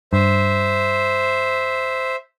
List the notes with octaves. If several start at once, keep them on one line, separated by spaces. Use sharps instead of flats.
G2 C5 E5